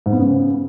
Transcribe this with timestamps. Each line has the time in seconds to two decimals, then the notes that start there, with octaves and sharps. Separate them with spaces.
0.06 G#2
0.13 B3
0.19 C#3